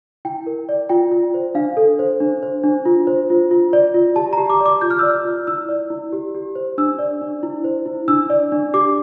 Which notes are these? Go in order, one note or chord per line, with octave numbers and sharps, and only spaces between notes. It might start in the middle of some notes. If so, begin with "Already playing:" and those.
E4 G5
A#4
D5
F4 G5
F4
C5
D4 F5
A4
C5
D4
C5
D4
F4
C5
F4
F4
D5
F4
G4 A5
A#5
G4
D6
D5
D6
F4 G6
F6
E6
D5
F6
F4
E4 E6
D5
E4
G4
G4
C5
D4 E6
D5
D4
E4
C5
E4
D4 E6
D5
D4
G4 D6